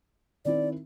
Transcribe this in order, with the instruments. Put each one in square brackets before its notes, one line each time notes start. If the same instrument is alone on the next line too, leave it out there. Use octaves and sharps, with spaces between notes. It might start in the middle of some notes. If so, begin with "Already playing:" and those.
[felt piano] D#3 C4 E4 [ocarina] D5